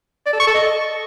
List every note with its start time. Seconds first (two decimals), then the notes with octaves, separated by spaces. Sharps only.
0.26 D5
0.33 A4
0.40 C#6
0.47 A4
0.54 D#5